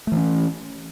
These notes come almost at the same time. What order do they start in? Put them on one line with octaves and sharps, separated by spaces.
A3 E3 C#4